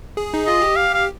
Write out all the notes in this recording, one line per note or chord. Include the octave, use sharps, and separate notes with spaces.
G#4
D#4
F4 D#5
G4
F5
F5